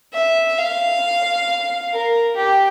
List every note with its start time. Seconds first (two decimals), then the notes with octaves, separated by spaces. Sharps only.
0.13 E5
0.58 F5
1.93 A#4
2.36 G4